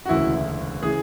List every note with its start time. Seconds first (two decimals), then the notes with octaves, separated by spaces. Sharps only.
0.06 F#4
0.09 E1 D2 C#3 E3 E4
0.83 C#3 E3 G#4